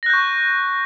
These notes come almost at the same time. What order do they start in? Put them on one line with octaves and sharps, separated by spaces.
A#6 F#6 G6 C#6